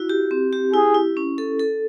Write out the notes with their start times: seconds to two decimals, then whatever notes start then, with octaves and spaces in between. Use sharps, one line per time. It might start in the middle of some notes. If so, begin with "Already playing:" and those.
Already playing: E4 F#4
0.09 G4
0.31 C4
0.53 G4
0.73 E4 G#4
0.95 E4
1.17 C#4
1.38 A4
1.60 A4